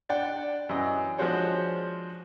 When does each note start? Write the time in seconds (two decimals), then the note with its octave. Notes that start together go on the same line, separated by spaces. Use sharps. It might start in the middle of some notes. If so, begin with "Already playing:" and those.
0.09 D4 D5 F#5 G5
0.69 F#2 E3 D#5
1.18 F3 G#3 D4 F#4 C5 C#5